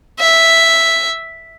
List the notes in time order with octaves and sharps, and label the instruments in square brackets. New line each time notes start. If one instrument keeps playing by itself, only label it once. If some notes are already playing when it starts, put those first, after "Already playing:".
[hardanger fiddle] E5